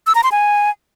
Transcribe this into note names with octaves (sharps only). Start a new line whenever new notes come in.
E6
A#5
C6
G#5